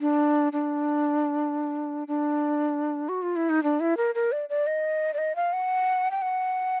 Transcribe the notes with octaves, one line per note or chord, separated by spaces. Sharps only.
D4
D4
D4
F#4
F4
E4
D#4
D4
E4
A#4
A#4
D5
D5
D#5
D5
D#5
F5
F#5
G5
F#5